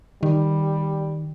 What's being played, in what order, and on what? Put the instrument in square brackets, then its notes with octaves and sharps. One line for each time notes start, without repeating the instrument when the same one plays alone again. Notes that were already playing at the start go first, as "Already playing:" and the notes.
[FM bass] D#3 [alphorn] G3